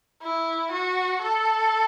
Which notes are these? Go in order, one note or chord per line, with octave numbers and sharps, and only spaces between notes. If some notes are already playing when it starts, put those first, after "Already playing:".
E4
F#4
A4